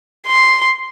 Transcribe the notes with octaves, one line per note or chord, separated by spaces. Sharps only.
C6